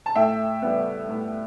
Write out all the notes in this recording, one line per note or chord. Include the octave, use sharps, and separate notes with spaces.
A5
A2 E5 G5
G3 B3
A2